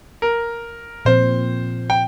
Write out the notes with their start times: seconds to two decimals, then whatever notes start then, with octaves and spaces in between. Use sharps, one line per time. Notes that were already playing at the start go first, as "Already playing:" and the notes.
0.22 A#4
1.05 A#2 F3 C4 C5
1.90 G5